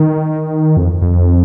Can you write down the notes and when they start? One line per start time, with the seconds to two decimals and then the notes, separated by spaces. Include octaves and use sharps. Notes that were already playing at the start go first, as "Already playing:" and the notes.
Already playing: D#3
0.77 F2
1.02 F2